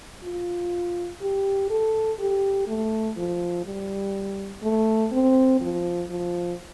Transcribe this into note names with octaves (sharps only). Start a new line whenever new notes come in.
F4
G4
A4
G4
A3
F3
G3
A3
C4
F3
F3